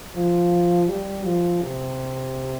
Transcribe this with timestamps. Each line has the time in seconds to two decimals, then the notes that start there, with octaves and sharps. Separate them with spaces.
0.15 F3
0.88 G3
1.25 F3
1.61 C3